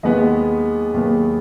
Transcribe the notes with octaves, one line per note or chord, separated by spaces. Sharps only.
D#2 D#3 G#3 B3 D#5
D#2 D#3 G#3 B3